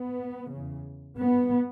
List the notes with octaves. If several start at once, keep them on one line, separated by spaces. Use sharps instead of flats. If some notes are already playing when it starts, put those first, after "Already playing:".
Already playing: B3
E2 C#3
G2 B3